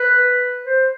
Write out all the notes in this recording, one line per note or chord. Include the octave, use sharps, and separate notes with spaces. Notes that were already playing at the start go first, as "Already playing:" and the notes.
Already playing: B4
C5